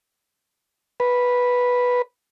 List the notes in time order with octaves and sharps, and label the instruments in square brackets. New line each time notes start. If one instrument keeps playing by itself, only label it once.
[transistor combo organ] B4